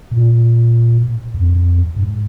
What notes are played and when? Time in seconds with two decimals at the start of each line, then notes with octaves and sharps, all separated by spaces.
0.11 A#2
1.34 F2
1.96 G#2